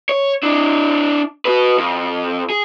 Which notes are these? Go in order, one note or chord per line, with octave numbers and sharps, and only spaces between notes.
C#5
D4 E4
F#4 B4
F2
G#4